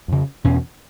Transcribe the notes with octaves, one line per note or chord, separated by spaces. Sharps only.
F2 C#3
E2 B2 C#4